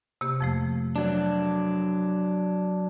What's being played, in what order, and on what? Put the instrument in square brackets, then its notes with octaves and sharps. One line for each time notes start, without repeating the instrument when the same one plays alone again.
[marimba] C3 A#3 G4
F2 F3 A3
[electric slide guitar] F#3 D4